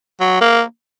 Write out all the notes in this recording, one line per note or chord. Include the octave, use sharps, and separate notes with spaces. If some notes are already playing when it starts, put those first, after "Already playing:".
F#3
A#3